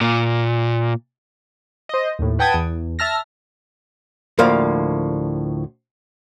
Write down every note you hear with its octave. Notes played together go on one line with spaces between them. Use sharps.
A#2
C5 D#5
D#2 A2
B4 F#5 G5 A5 D#6 G#6
E2
E5 A5 F6 A#6
D2 A2 F3 A#3 D5 F5